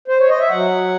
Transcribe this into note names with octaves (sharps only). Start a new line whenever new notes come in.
C5
C#5
D#5
E5
F#3 F#5